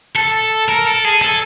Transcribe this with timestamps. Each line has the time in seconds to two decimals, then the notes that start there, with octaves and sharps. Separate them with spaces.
0.16 A4
0.69 A#4
0.87 A4
1.04 G#4
1.22 A4